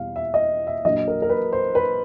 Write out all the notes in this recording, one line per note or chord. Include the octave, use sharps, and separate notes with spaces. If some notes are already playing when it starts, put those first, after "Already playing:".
Already playing: E2 B2 G3 F5
E5
D#5
E5
A#1 A#2 F#3 D#5
A#4
A#4
B4
C5
B4